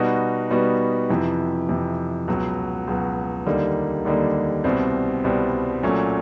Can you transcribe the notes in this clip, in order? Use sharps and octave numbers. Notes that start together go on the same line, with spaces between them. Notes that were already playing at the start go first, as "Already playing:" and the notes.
Already playing: B2 G3 B3 D#4 F#4
B2 G3 B3 D#4 F#4
F2 C3 E3
F2 C3 E3
C#2 B2 F#3
C#2 B2 F#3
D#2 D3 G3 A#3 D#4
D#2 D3 G3 A#3 D#4
C2 B2 G3 C4
C2 B2 G3 C4
A#2 F#3 A3 C#4